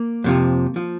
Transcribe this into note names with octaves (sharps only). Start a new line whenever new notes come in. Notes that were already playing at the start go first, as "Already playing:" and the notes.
Already playing: A#3
F2 C3 F3
F3